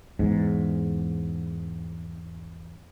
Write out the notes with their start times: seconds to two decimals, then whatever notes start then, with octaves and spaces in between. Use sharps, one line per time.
0.19 E2 G#2